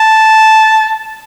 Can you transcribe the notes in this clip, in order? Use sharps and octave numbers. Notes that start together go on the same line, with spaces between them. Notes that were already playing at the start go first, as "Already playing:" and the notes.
Already playing: A5